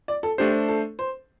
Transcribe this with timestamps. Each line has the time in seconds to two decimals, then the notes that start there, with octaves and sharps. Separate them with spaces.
0.08 D5
0.23 A4
0.38 A3 D4 G4 C5
0.69 A4
0.99 C5